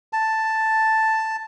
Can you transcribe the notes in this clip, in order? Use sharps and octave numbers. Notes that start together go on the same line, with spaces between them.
A5